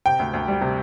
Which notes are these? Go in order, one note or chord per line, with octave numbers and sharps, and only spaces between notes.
C3 G5
D2
D2
G3
C3